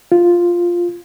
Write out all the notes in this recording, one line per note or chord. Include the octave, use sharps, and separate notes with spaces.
F4